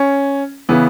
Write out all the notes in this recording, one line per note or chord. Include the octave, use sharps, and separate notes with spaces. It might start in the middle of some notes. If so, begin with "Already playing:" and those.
Already playing: C#4
C#3 E3 B3